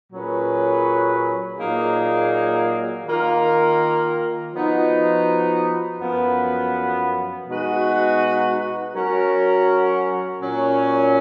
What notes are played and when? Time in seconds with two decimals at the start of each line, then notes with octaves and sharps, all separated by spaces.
0.12 A#2 F#3 C#4 G#4 B4
1.59 A#2 F#3 A#3 D#4 G#4
3.06 D#3 A#3 F4 A#4
4.53 F3 B3 D#4 F#4
6.00 F#2 F3 B3
7.47 B2 G#3 D#4 F#4 B4
8.94 F#3 C#4 F#4 A#4
10.41 A#2 F#3 C#4